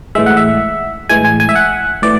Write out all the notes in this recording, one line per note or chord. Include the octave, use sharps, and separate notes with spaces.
A2 E3 G#3 E5
F#5
E5
A2 E3 G#3 G#5
G#5
G#5
E5
F#5
A2 E3 D5